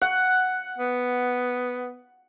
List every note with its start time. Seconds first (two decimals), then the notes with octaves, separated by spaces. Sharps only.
0.02 F#5
0.78 B3